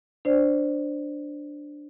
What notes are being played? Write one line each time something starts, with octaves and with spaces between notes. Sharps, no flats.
D4 C5 D5